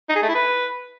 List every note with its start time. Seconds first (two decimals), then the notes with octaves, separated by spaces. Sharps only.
0.09 D#4
0.16 G#4
0.22 A3
0.29 E4
0.35 B4